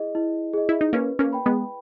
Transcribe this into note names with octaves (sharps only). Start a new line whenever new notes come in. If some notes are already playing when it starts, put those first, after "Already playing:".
Already playing: E4 G#4 D#5
E4
G#4 D#5
E4
D#4
A#3 C#4 B4
A#3 C#4
G5 B5
G#3 B3